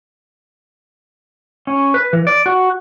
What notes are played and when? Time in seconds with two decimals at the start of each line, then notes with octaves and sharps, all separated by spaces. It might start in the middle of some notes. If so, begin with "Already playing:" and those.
1.67 C#4
1.94 B4
2.13 E3
2.27 D5
2.46 F#4